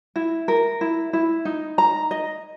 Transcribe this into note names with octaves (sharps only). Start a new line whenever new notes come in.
E4
A#4
E4
E4
D#4
A#5
D#5